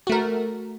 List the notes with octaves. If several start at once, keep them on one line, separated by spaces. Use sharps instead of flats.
A3 F#4 A#4